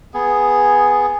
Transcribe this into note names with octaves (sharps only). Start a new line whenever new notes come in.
B3 G#4